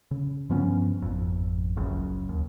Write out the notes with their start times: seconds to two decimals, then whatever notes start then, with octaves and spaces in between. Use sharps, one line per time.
0.11 C#3
0.50 G2 F3 B3 C#4
1.02 G#1 F2
1.76 F#1 C#2 F#2 C#3
2.29 D#2